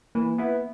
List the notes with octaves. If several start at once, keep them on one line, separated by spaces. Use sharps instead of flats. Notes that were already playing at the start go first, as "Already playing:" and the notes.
E3 A#3
B3 E4